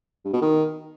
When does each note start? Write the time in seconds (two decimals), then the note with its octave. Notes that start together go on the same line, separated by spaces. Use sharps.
0.25 G2
0.33 B2
0.42 D#3